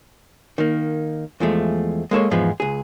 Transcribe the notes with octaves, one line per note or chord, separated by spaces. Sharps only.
D#3 A#3
E2 F3 G#3 A3
G#3 A#3 A4 C#5
E2 G#2 F3 G#3 B3
C#2 G#4